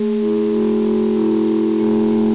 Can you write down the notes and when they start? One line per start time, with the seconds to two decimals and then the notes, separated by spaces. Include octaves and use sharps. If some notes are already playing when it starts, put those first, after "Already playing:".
Already playing: A3 G#4
0.22 E4 G#4
0.53 A3 F#4
0.85 A3 F#4
1.17 E4
1.48 E4
1.79 A3 G#4
2.11 A3